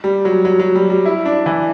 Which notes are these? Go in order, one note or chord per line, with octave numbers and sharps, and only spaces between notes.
G3
F#3
F#3
F#3
G3
G3
E4
D4
E3